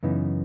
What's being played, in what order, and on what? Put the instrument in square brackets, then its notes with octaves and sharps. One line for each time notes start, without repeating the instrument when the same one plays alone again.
[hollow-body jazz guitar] F#2 C#3 E3 B3 D#4